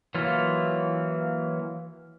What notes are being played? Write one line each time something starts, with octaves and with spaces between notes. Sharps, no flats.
E3 F#3 A#3 F4